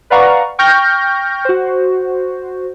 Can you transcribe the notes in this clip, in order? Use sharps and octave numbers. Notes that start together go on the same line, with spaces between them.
B4 D5 F5 F#5 A#5 C#6
G5 C#6 F6 G6 A#6
F#4 C5